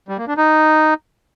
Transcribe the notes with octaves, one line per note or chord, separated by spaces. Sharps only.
G3
A#3
D4
D#4